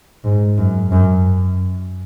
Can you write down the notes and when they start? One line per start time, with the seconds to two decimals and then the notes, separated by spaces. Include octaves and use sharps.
0.24 G#2
0.58 F#2
0.92 F#2